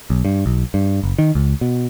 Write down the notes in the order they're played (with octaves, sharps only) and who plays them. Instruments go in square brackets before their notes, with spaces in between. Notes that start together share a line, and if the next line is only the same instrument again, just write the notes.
[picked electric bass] B1
G2
B1
G2
F#1
D#3
C#2
B2